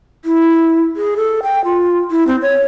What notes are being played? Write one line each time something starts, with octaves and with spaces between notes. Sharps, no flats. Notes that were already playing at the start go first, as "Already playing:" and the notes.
E4
G#4
A4
G5
F4
E4
C4
C#5